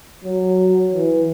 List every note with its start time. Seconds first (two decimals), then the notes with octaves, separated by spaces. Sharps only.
0.24 F#3
0.92 E3